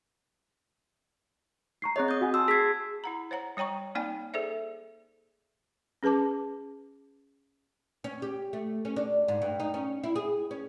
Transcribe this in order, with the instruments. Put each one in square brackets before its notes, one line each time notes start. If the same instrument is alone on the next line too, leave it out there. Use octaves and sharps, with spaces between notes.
[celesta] A#5 C#6 C7
[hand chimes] C4 G#4 D#5 [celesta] C#5 C#6 F#6
[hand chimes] D#6 G6
[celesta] F#4 F#5 G#5
[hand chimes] A5 C6 E6
[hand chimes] G#4 E6 G#6 [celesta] B6 C7
[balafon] E4 F#5 A#5
C5 C#5 F#5 A#5
G3 C#5 G5 A#5 C#6
A#3 C4 D#4 D5 G5 G#5
G#4 A4 C5 D5 E5
C#4 G#4 B4 A5 D6
[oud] C#4
G4
A3
C#4
D4
G#2
G2
D#4
C#4
E4
G#4
C#4